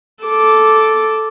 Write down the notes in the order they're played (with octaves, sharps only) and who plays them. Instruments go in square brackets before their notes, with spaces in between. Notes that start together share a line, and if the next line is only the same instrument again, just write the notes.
[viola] A4 D6